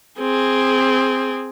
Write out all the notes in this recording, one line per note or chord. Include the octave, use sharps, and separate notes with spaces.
C4 G#4